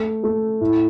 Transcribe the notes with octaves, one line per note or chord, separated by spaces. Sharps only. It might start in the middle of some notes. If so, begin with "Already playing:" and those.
Already playing: A3
A3
A2